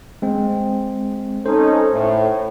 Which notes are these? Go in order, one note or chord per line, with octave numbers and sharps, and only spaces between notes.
G#3 C4
C#4 D#4 A4 C5
A2